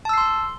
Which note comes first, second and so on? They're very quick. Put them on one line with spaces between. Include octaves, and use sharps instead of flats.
A5 E6 C7 C6